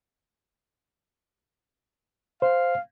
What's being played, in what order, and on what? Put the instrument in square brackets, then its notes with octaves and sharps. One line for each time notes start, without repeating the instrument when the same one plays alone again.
[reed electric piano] C5 [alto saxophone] F5